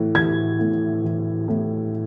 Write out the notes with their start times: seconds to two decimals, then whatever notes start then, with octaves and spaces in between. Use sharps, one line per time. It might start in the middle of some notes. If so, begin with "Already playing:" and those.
Already playing: A2 E3
0.15 E3 G#6
0.59 A2
1.04 E3
1.48 A2